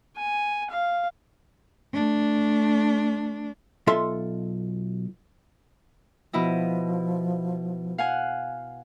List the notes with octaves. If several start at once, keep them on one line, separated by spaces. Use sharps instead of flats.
G#5
F5
A3 D4
B1 F4 A4 E5 C6
B2 F3 E4 D#5
F5 F#5 G#5